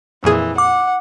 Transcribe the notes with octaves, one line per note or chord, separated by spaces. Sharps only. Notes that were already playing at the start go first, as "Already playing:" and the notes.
F2 A#2 E3 G#4
F#5 D6